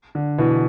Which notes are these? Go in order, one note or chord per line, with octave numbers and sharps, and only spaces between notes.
D3
B2 E3